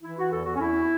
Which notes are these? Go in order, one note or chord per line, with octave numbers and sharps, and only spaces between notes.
E3 E4
F#4
E2 A4
F#4
C#4
E2 E4